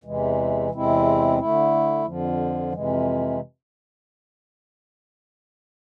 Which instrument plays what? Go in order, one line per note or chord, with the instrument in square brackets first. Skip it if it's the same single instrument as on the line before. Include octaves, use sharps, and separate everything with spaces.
[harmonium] E2 C3 E3 G#3
E2 C3 G#3 C4 E4
D3 A3 E4
F2 D3 F3
F2 C3 E3 G#3